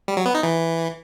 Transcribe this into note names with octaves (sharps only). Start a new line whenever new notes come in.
G3
F#3
B3
D#4
E3